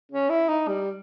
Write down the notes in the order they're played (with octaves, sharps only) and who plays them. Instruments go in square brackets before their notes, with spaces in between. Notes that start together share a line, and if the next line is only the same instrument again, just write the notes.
[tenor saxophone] C#4
E4
D#4
G3